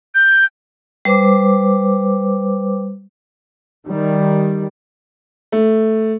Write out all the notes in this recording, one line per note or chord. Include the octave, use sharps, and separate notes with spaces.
G6
G3 B4 C5 D6
D#3 G3
A3